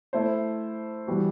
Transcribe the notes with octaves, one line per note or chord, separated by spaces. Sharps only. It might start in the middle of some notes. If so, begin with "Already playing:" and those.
A3 E4 A4 C5
E3 G3 B3 F#4